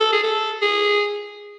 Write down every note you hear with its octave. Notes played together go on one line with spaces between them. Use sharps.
A4
G#4
A4
G#4